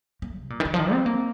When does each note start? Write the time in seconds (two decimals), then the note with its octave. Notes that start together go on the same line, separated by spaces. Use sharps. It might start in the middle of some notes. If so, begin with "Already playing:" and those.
0.22 A#3
0.37 C3
0.50 A#2
0.60 D#3
0.65 D3
0.74 F3
0.79 D#3
0.92 C4
1.06 A#3